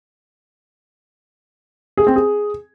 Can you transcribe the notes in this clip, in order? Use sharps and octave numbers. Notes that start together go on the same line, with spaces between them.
G#4
C4
G#4